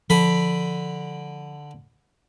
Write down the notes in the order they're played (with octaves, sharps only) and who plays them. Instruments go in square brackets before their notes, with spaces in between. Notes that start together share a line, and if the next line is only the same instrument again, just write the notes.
[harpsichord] D3 B5 [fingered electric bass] F3